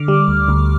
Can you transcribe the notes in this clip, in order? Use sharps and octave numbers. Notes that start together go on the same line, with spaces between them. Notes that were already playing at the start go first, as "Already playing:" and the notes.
Already playing: D3 D6 F6
G3
D2
D2